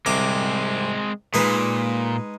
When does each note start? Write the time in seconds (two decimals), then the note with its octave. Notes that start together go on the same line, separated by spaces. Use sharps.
0.06 C2 G#3 C4 D6
1.34 A#2 G#3 D#4 B4